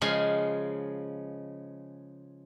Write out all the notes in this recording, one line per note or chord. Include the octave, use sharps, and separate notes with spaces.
C#3 F3 G#3 F5 G#5